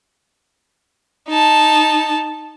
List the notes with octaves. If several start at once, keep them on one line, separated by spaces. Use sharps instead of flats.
D#4 A5